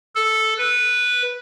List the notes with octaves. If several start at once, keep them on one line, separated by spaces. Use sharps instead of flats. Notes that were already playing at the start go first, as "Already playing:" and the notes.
A4
B4